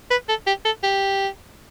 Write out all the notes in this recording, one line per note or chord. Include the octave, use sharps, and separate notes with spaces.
B4
A4
G4
A4
G4